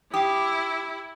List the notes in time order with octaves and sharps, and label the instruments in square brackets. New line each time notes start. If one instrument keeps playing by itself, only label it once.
[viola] E4 [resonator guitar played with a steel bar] G4 [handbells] G5 D#6